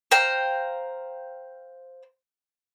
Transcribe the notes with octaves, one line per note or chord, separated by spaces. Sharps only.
C5 F5 G5 A#5